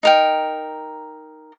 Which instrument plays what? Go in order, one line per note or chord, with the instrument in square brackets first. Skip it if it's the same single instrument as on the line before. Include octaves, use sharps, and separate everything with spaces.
[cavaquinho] D#4 A#4 G5